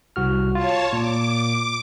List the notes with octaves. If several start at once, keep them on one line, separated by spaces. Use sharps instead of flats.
C2 F#4 F6
F4 C#5 A5
A#2 D6